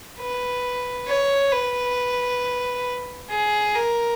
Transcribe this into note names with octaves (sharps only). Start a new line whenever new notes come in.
B4
C#5
B4
G#4
A#4